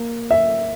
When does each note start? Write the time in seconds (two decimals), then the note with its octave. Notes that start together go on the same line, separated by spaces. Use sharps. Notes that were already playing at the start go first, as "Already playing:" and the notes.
Already playing: A#3
0.31 E5